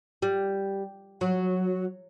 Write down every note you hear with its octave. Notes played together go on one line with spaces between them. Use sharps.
G3
F#3